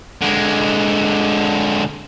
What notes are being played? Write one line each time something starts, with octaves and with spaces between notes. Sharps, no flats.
D3 G#3